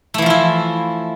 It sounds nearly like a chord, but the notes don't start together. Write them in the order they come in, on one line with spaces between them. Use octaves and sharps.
A3 E3 F3 F4 E4